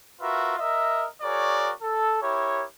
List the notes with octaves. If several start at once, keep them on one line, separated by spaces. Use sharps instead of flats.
F4 F#4 A#4 B4 E5
A#4 D#5 E5
F#4 G#4 A#4 C#5 D5
A4
E4 G4 A#4 C#5